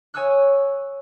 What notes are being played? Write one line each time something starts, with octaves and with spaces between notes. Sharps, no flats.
C#5 G#5 C#6 D#6 E6 F#6